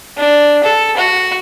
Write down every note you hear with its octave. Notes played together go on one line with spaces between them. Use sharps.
D4
A4
F#4